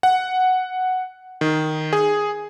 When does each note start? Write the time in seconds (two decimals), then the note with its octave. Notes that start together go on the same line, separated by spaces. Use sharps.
0.03 F#5
1.41 D#3
1.93 G#4